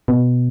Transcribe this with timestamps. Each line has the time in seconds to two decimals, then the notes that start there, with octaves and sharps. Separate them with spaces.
0.08 B2